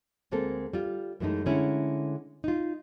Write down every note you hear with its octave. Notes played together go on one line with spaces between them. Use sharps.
D2 G#3 A#3 C4 A4
G3 F4
F#2 E3 G#3 A3 D#4
D3 G#3 A3 C#4 E4
D#4 F4